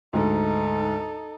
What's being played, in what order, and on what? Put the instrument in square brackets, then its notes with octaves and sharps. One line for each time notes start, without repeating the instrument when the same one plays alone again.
[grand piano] D2 G#2 [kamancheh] D#4 A4